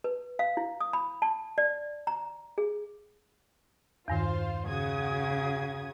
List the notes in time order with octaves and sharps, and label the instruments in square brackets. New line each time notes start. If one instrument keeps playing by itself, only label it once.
[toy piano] B4
F5
E4
D#6
B5
A5
D5
A#5
G#4
[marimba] E2 G2 D#3 [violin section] F4 C5 F5
[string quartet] C#3 [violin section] F#4 D#6 G#6